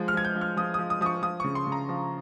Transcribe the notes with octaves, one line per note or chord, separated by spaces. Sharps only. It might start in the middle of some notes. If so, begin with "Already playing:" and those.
Already playing: F3 G#3
F6
F3 G#6
G6
F3
F6
F3 D#6
D#6
F3
D#6
F3 C#6 D#6
F3 D#6
C#6
C#3
C6
C#3
A#5
F3